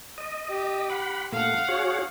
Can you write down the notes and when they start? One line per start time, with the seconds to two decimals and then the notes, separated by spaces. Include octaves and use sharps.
0.18 D#5
0.51 G4
0.90 F#5 B5
1.32 A#2 A3 F5 F#5
1.68 F#4 G#4 C#5